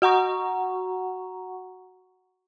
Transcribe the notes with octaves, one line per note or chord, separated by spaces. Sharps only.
F#4 F#5 A#5 C#6